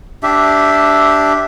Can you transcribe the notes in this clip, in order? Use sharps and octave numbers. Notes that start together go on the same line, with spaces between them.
D4 G4 E5